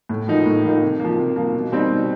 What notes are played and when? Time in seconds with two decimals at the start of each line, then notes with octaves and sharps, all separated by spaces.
0.09 A2
0.28 F3 A#3 D#4
0.46 A2
0.64 F3 A#3 D#4
0.82 C3
1.00 F3 A#3
1.18 C3
1.36 F3 A#3
1.54 B2
1.72 G3 C4 D#4
1.90 B2